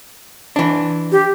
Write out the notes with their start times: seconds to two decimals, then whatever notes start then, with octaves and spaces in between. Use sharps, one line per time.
0.56 E3 D4
1.12 G4